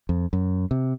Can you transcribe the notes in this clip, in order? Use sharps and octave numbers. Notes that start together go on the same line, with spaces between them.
F2
F#2
C3